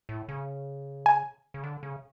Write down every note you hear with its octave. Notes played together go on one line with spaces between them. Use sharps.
A2
C#3
G#5
C#3
D3
C#3